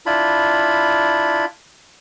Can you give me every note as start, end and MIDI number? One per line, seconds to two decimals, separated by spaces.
0.06 1.45 62
0.06 1.45 64
0.06 1.45 65
0.06 1.45 83